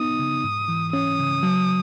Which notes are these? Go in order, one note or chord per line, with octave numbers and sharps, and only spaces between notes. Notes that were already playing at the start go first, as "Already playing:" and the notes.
Already playing: B3 D#4 D#6
C#3
G#2
E3
C#4 D#6
C#3
F#3